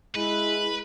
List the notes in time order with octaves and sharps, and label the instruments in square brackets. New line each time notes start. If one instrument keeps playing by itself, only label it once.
[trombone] G#3 [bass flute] E4 [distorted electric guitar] B4